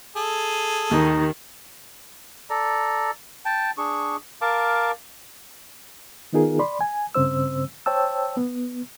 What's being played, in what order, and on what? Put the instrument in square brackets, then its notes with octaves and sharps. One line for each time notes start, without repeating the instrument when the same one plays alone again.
[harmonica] G#4 A4
[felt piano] D#2 [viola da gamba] D#3 [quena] D#4
[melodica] A4 D5 A#5
G5 A5
D4 G#4 C#6
A#4 F5 A5 D6
[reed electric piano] D#3 B3 D#4 F4 G#4 A#4
D5 B5 C6
G#5
G2 C#3 C4 C5 E6
C5 C#5 G5 A5 E6
B3